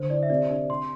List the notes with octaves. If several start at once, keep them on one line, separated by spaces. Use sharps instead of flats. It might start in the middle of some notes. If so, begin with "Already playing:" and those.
Already playing: D3 C5
E4 D5
E5
C3 D5
D4
C3 C6